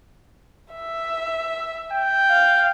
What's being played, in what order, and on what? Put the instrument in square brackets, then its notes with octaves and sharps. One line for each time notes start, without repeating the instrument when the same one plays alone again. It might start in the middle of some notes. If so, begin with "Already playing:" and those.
[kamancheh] E5
[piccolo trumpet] G5
[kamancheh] F5